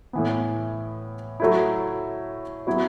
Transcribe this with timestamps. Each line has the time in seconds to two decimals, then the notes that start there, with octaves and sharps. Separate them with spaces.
0.13 A2 E3 B3
1.40 F#3 A3 E4
2.67 F#3 B3 E4